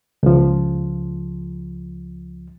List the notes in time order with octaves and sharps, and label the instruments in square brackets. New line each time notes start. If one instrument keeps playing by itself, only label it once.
[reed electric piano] C#2 F3